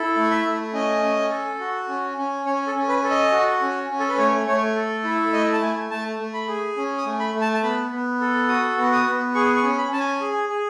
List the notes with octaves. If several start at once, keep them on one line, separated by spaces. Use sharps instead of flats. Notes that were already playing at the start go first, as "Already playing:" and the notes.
Already playing: E4 A4
A3
E5
A3
C#4 D#5
C#4
A4
F#4
C#4
C#4
C#4 C#5
A4
C#4
B4
A4
D#5
F#4
C#4
C#4
A4
B4
A3 C#5
A3 C#5
A4
E4
A3 D#5
A5
A3 G#5
A3 A5
A3
B5
G#4
C#4
D#6
A3
B5
A3
A5
A5
B3 B5
B3
A4
F#4 D#6
B3
D#6
B3
G#4 C#6
C#6
C#4
B5
C#4 A5
G#5
G#4
G#4